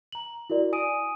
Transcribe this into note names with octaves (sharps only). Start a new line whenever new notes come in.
A#5 F#7
E4 F#4 A#4 D5
G#5 D#6 D7 D#7